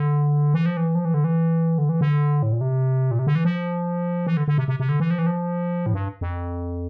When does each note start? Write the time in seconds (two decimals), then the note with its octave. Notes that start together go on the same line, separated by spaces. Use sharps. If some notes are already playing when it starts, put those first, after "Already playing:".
Already playing: D3
0.54 E3
0.66 F3
0.77 E3
0.95 F3
1.05 E3
1.14 D3
1.24 E3
1.78 D3
1.89 E3
2.01 D3
2.43 A2
2.52 A#2
2.61 C3
3.11 A#2
3.19 C3
3.27 D3
3.35 E3
3.45 F3
4.27 E3
4.37 D3
4.48 D3
4.58 C3
4.68 C3
4.80 C3
4.89 D3
5.00 E3
5.11 F3
5.19 E3
5.27 F3
5.86 A2
5.94 G2
6.21 F2